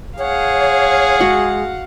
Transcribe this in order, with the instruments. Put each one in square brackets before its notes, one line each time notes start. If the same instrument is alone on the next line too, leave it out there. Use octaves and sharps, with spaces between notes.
[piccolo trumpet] G#4 [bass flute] C#5 [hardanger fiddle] F5 F#5
[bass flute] G#3 [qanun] F#4